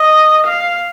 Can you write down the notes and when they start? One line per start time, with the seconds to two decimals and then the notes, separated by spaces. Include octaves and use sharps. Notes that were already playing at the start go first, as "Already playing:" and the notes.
Already playing: D#5
0.47 F5